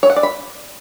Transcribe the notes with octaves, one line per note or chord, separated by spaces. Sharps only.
C#5
F#5
D5
B5